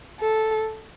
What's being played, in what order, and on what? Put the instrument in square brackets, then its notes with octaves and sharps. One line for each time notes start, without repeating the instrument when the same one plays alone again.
[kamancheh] A4